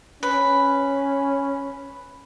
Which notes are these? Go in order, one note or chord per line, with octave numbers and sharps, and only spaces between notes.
C#4 B4